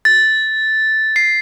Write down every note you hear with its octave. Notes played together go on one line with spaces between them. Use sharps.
A6
C7